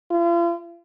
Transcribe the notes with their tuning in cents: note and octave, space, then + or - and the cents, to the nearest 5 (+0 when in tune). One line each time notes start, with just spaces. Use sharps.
F4 -40